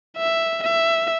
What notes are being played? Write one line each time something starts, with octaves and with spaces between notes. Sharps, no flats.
E5
E5